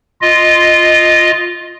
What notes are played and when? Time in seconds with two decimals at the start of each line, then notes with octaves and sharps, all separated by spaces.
0.21 F4 D#5